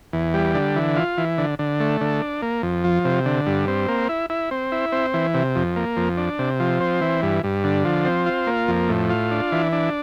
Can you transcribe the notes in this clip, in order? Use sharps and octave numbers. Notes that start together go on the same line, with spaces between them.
E2
G3
D3
E3
F4
E3
D3
D3
A3
D3
D4
A#3
F2
F3
C3
D3
G2
C4
A#3
E4
E4
C4
E4
C4
E3
C3
F2
A#3
F2
D4
C3
F3
C4
E3
G2
G2
D3
F3
C4
F4
A#3
F2
A2
F4
D4
E3
D4